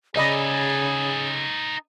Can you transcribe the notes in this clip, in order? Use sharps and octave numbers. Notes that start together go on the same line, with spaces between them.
C#3 D#4 G#4 A4 D5 D#5 B5